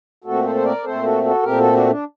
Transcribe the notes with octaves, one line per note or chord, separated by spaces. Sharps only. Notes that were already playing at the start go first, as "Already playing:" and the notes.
A#2 A3 C4 F#4 A4
A4 C5
C5
A#4 D5
A#2 A3 C4 A4 C5
F#4 A4
F#4 A4
A#2 A3 C4 G4 A#4
F#4 A4
D4 F#4
D4